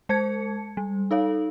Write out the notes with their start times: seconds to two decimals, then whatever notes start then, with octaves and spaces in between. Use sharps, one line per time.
0.09 G#3 C5 A5 G#6 C#7
0.77 G3
1.11 D#4 A4 C#5 F5